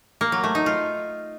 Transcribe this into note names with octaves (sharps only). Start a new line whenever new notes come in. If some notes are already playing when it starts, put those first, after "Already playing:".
A#3
F#3
A3
D#4
F4